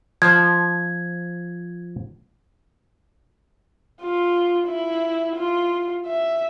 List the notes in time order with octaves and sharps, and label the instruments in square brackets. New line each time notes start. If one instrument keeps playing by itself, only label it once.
[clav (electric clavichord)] F3 C5 A5 [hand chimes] G#6
[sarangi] F4
E4
F4
E5